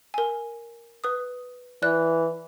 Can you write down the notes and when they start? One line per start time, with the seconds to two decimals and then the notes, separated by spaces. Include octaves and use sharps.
0.14 A#4 G#5
1.04 B4 D#6
1.82 E3 D5 F#6